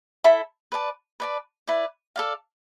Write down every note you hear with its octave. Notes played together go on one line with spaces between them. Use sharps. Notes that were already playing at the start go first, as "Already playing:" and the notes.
E4 A4 E5 B5
B4 D5 A5
B4 D5 A5
E4 B4 D5
A4 D5 F5